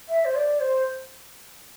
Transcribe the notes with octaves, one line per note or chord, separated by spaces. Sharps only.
E5
C5
D5
C5